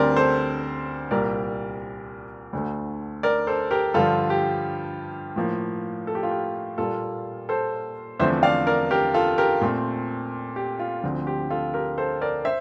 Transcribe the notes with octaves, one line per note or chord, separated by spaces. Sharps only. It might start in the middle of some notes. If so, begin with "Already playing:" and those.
Already playing: D2 D3 G3 C4 A#4 D5
A4 C5
C2 A#2 G3 A#3 A#4 D5
D2 D3 A3
A#4 D5
A4 C5
G4 A#4
G2 D3 F3 F4 A4
G4
A2 F3 A#3
A4
G4
F4
G4
A#2 G3 A#3 F4 A4
A4 C5
E2 D3 F3 A3 C4 C5 E5
D5 F5
A#4 D5
G4 A#4
F4 A4
G4 A#4
A#2 A3 C4
G4
F4
D2 D3 F3 C4
G4
F4 A4
G4 A#4
A4 C5
A#4 D5
C5 E5